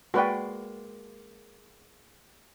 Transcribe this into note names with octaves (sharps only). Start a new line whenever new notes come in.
G#3 A#3 F#4 B4 D5 G5